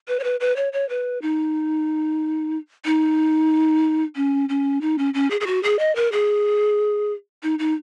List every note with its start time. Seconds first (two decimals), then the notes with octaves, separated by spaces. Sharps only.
0.08 B4
0.20 C#5
0.24 B4
0.40 B4
0.56 C#5
0.73 C#5
0.89 B4
1.22 D#4
2.85 D#4
4.16 C#4
4.49 C#4
4.81 D#4
4.98 C#4
5.14 C#4
5.31 G#4
5.41 G#4
5.47 F#4
5.63 G#4
5.79 D#5
5.96 A#4
6.12 G#4
7.43 D#4
7.59 D#4